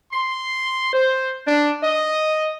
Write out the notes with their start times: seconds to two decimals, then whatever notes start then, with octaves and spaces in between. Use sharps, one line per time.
0.13 C6
0.93 C5
1.47 D4
1.83 D#5